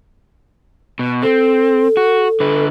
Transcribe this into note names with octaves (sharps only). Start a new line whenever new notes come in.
B2
C4 A4
F#4
D3 B4